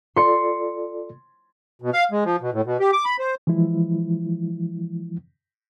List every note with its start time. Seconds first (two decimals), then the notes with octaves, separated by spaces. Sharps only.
0.16 F4 A4 D5 C6 C#7
1.82 B2
1.93 F5
2.11 G#3
2.24 F3
2.41 B2
2.53 A2
2.65 B2
2.80 G4
2.93 D6
3.05 B5
3.19 C5
3.47 E3 F3 G#3 E4